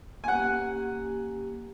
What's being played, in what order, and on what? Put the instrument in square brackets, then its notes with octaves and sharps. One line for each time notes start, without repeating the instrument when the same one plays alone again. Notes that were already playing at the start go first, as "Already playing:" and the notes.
[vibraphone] A#3 C#4 G4 [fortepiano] F#5 G#5